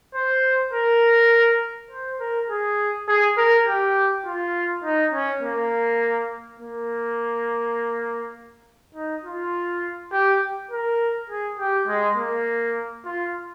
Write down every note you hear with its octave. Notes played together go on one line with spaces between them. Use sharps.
C5
A#4
C5
A#4
G#4
G#4
A#4
G4
F4
D#4
C#4
A#3
A#3
D#4
F4
G4
A#4
G#4
G4
G#3
A#3
F4